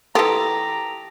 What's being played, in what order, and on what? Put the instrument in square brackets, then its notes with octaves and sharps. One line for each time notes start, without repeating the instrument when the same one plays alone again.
[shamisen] E3 F4 [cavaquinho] G4 D#6 [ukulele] A4 [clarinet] A#5